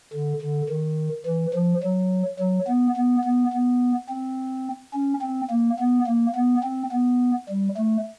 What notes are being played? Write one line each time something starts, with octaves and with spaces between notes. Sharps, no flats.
D3
D3
D#3
E3
F3
F#3
F#3
B3
B3
B3
B3
C4
C#4
C4
A#3
B3
A#3
B3
C4
B3
G3
A3